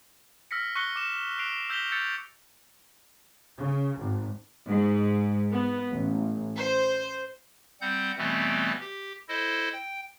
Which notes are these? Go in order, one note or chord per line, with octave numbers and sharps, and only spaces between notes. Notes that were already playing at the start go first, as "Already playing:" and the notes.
E6 F6 A#6 B6 C#7
C#6 F#6 A#6 C#7 G7
D6 E7
F#6 C7 D7 F7
E6 G6 A#6 B6 F7 G7
E6 G6 A6 C#7 F7
C#3
G#1
G#2
B3
A1
C5
G3 C4 F#5 G6
B2 E3 G3 A3 B3 C4
G4
E4 A4 C5 D#5
G5